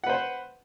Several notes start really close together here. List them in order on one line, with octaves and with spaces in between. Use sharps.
F#5 B4 C5